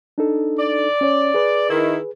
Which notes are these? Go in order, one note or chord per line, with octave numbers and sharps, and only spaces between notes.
D4 D#4 A4
D5
C#4 C#5
G#4 B4
D#3 E4